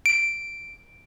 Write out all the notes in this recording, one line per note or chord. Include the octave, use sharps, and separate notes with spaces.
D7